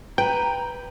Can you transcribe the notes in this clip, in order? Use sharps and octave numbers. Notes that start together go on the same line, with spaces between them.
B4 G5 A#5